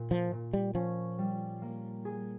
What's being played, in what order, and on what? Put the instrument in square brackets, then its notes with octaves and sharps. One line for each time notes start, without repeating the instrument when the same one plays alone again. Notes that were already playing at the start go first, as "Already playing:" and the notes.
Already playing: [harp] A#2
[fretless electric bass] F3
[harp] A#2
[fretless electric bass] G3
[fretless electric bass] F3 [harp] C#4
[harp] G3
A#3
G#4